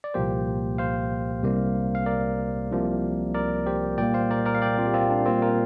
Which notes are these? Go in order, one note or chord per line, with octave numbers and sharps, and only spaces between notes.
D5
C2 A#2 F3 A#3 G4 C5
C5 F5
C2 C3 G3 A#3
F5
A#4 D5
C2 C3 F3 A#3
A#4 D5
G4 C5
A#2 G3 A#3 D5 G5
C5 F5
A#4 D5
A#4 D5
F5
D5 G5
C4 F4
G4
C4 F4
D4
A#2 G3 A#3 C4 F4
F4 A#4